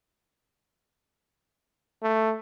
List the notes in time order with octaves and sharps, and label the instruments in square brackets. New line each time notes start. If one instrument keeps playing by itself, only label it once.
[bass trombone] A3